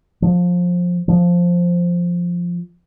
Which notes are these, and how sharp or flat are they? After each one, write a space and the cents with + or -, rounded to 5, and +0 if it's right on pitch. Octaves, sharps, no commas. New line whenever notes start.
F3 +20
F3 +0